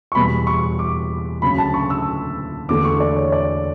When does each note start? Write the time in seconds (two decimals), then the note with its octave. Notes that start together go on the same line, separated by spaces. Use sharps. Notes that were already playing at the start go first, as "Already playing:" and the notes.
0.12 C#6
0.15 E2 B2 G3 B3 B5
0.47 C#6
0.79 D6
1.42 D2 C#3 F#3 B5
1.58 A5
1.74 C#6
1.90 E6
2.69 E2 D3 A3 D6
2.85 C#6
3.00 D5
3.17 C#5
3.32 D5